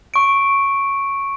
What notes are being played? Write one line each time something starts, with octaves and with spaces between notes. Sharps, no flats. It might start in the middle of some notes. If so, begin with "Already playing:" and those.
C#6 D7